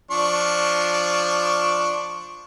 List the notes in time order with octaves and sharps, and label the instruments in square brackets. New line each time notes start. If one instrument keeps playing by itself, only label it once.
[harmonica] F3 D4 C#6